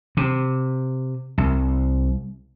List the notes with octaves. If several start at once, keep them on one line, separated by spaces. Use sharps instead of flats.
C3
C2